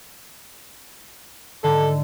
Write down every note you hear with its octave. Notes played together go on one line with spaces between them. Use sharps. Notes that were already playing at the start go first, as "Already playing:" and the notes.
G#2 D3 A4